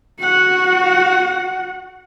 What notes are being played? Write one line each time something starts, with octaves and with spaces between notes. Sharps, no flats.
F#4 F#5